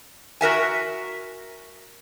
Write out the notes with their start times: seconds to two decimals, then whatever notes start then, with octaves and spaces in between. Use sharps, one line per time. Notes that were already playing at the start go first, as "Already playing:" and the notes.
0.41 F#4 A#4 E5 G#5